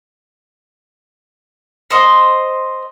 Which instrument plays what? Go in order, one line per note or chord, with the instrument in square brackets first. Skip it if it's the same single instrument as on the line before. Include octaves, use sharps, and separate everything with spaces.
[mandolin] C5 D#5 C6